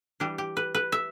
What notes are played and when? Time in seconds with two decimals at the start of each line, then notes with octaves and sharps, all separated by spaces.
0.20 E3 G3 D4 G4
0.38 G4
0.57 B4
0.75 B4
0.92 E5